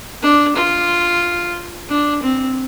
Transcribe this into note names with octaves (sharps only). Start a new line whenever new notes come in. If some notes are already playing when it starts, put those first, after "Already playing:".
D4
F4
D4
C4